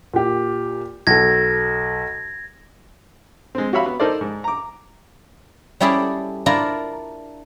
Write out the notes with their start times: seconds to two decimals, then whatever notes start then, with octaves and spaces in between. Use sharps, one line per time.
0.14 A#2 G4
1.07 B1 A4 G#6 A#6
3.55 G#3 C4
3.73 F#4 G4 C#5 E5 F5 B5
3.86 B3
4.00 D#4 A4 A#4 C5 D5
4.21 G#2
4.44 A#5 D6
5.80 G3 C#4 E4 G#4 A4 D5
6.46 D4 E4 F4 A#4 A#5